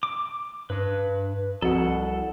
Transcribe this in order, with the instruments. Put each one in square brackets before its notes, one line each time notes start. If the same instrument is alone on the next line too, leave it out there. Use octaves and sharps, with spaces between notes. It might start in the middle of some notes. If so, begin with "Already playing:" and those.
[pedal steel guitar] D6
[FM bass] G2 [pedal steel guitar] B4
[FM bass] C2 [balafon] F3 C4 F#4 [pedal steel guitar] A4 F#5